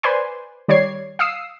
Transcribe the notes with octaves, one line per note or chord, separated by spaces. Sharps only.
B4 C5 D5 G#5 C6
D#3 G3 C#5 D5 G#6 C7
F5 D#6 E6 C7